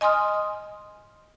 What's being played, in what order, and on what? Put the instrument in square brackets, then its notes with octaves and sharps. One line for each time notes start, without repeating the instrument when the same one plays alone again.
[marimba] D#5 G#5 C6 D#6 F6